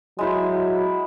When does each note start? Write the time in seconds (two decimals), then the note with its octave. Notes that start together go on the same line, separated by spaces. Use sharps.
0.19 F#3 G#3 E4 C5